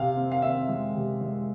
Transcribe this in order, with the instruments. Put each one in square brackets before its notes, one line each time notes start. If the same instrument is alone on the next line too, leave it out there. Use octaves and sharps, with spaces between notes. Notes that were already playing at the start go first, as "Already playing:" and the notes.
Already playing: [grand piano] C3 F5
C4
F5
C4 E5
G#3
C3
G#3